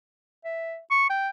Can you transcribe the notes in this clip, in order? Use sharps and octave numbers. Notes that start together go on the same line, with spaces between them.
E5
C#6
G5